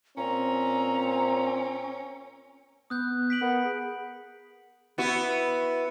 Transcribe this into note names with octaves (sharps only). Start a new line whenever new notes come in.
A#2 C4 C#4 A#5
B3 D#6 F#6 G6
B6 D7 F#7
B3 A#4
G#4
B3 E4 F#4